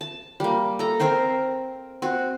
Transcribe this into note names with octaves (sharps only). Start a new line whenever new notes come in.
A5
G3 A#3
A4 A#5
C4 A#4 C5 G5
C4 F#4